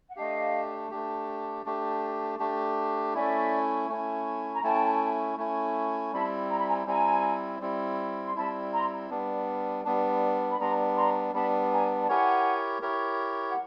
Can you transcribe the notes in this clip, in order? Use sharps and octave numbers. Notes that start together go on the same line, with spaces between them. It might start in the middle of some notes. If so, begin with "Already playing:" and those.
F#5
A3 D4 G4 D#5 F5
A3 D4 G4
A3 D4 G4
A3 D4 G4
A3 C#4 E4 D5 E5
A3 C#4 E4
A#5
A3 C#4 E4 G5 A5
A3 C#4 E4
G3 C4 E4 A5 B5
A#5
B5
G#5 A#5
G3 C4 E4 G#5 A#5
G3 C4 E4
C6
G3 C4 E4 A5 B5
A#5 C6
G3 B3 D4
G3 B3 D4
B5
G3 B3 D4 A#5 C6
A#5 C6
G3 B3 D4 A5 B5
G#5 A#5
A5
E4 G4 A#4 C#5 F#5 G#5
E4 G4 A#4 C#5
F#5